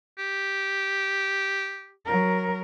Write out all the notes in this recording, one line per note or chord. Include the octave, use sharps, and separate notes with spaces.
G4
F#3 A#4